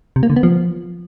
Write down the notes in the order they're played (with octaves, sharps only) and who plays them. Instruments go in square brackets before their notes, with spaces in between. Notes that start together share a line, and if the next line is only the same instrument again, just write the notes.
[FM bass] C3
A#3
D3
B3
F3